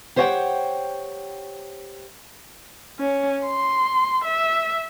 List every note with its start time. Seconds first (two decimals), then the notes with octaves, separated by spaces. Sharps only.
0.16 G4 C5 C#5 D#5 F#5 G5
2.99 C#4
3.47 C6
4.25 E5